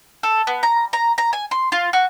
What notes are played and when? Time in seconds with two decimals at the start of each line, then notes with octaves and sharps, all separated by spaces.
0.23 A4
0.47 B3
0.63 A#5
0.93 A#5
1.18 A#5
1.33 G#5
1.51 C6
1.72 F4
1.93 F#4